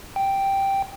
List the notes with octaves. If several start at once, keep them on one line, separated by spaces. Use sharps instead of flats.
G5